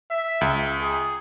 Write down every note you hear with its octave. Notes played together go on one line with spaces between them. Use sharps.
E5
C#2
G#4